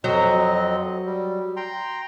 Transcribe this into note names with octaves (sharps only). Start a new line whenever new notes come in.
F2 F#3 C4 D#5
G3
G5 A#5 C6